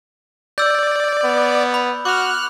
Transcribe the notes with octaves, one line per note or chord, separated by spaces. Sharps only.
D5 E6 G6
B3
B5
F#4 D6 F6 F#6